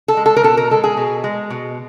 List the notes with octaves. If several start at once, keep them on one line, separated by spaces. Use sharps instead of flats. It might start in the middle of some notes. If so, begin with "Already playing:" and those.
A4
G#3
A4
A#4
B2 A4
A#4
G#3 A4
G#4
B2
G#3
B2